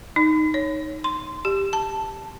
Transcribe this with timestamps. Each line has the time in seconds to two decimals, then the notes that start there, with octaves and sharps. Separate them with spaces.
0.16 D#4
0.54 C#5
1.04 C6
1.45 G4
1.73 A5